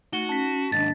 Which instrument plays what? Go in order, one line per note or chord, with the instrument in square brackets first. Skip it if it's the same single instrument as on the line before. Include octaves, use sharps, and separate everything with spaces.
[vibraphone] A3 [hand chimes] D#4 [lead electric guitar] F#4 [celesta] G7
[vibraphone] C#4 [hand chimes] A5 B6
[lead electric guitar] D#2 G#2 [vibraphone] D4 D#5 [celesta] A6